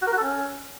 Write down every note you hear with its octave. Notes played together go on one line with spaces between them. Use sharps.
F#4
A#4
F#4
A4
C#4